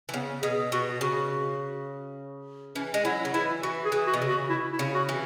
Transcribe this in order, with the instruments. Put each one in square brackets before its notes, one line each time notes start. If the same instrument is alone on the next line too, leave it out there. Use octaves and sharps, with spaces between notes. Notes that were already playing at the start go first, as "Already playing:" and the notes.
[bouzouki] E3
[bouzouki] C#3 [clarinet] B3
[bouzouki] B2 [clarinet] G#4
[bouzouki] B2 [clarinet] F#4
[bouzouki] C#3 [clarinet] F#4
[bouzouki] E3 [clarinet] C#4
[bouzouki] G#3
[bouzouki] F#3 [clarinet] E4
[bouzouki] C#3
[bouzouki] E3 [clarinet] E4
[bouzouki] E3 [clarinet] F#4
[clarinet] G#4
[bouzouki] E3
[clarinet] F#4
[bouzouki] B2
C#3
[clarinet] F#4
E4
E4
[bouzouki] C#3
[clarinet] F#4
[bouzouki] E3